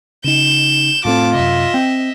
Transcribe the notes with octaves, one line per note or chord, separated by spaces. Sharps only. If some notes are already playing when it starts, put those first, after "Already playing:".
C#3 D#4 G6 E7
A2 A3 C4 F4 A5 D6
F#2 C3 D#5 E5
C4 G5